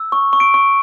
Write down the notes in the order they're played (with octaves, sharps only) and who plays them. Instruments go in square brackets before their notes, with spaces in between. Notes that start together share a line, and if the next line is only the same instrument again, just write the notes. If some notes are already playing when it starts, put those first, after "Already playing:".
Already playing: [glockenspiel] E6
C#6
C#6
D7
C#6